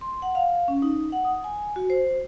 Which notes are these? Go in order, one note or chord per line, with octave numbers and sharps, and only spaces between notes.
C6
F#5
F5
C#4
D#4
F#5
D#6
G#5
F#4
C5